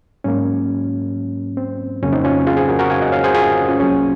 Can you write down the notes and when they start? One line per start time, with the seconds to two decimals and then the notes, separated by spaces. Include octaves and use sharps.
0.24 G#2 F#3 A#3 C#4
1.57 C4
2.02 F2 C#3 F#3 A#3 C#4
2.12 C4 D#4
2.24 C#4 F4
2.47 F4 G#4
2.57 G#4 C5
2.69 F#4 A#4
2.79 F#4 A#4
2.90 F5 G#5
3.02 D#5 F#5
3.12 C#5 F5
3.24 G#4 C5
3.34 F4 G#4
3.68 C#4 F4
3.80 C2 C3 F#3 A#3 C#4